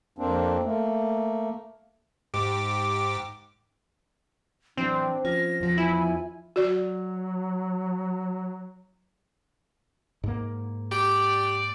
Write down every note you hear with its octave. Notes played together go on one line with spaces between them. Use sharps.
F2 A#3 C4 D4
A3 A#3
G#2 G4 D6
A2 E3 F#3 C4 D4
F3 C#4 F4 A#6
E2 F3
E4 G#5
F#3 F#4 D5
G#2 A#3
G4 D5